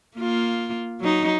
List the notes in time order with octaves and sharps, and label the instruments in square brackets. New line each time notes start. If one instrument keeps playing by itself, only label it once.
[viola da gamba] A#3 F4
F#3 D#4